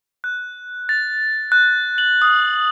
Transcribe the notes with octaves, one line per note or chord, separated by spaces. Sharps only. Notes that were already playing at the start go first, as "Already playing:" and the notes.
F#6
A6
F#6
F#7
D#6